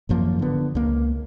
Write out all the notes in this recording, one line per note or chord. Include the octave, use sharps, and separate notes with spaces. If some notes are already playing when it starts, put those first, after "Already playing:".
G#1 F#2 F3 A#3
D3 B3
C#2 A#3